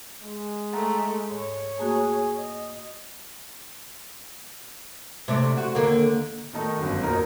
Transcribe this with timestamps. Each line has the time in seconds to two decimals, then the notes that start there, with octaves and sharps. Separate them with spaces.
0.21 G#3
0.72 A3 F#5 A#5
1.31 G#2 C#5
1.79 A3 A#3 F#4 G#4
2.38 D#5
5.28 C3 A3 D4
5.57 F#4
5.75 D#2 D3 A#3
6.53 D#3 A3 D#4
6.78 G1 F#2
7.03 D#1 D#4 A#4 A#5